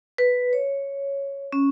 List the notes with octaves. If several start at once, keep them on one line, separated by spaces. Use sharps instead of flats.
B4
C#5
C#4